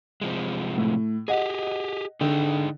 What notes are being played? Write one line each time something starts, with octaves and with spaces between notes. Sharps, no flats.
C3 F3 G#3
A2
G4 G#4 D#5 F#5
D3 D#4 G#4 G5